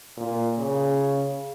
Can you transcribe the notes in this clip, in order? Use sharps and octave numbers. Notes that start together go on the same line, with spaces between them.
A#2
C#3